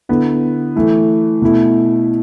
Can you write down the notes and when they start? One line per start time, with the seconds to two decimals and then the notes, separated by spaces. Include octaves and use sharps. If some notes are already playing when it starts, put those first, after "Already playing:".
0.09 D3 B3 E4
0.76 E3 A3 E4
1.42 B2 A3 E4